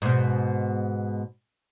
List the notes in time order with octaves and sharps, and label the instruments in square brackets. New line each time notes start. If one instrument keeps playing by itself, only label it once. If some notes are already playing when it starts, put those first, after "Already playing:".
[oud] G#2 B2